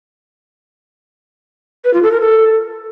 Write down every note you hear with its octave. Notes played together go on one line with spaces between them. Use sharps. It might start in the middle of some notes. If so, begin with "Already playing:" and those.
B4
F4
A4
A#4
A4